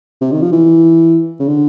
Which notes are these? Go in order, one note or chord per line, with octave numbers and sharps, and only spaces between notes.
C3
D#3
F3
E3
C#3
D3